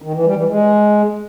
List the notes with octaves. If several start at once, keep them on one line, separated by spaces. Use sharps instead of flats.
D#3
E3
G3
E3
G#3